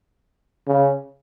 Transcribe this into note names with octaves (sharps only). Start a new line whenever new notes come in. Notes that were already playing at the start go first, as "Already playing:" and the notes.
C#3